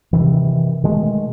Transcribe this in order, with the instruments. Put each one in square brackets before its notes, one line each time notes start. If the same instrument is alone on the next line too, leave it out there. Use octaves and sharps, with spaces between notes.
[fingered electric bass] C3 D#3 E3
B2 D#3 G#3 A3